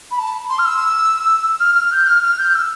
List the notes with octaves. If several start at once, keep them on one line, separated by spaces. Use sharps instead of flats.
B5
A5
C6
F6
E6
F6
F6
G6
F6
F6
G6
E6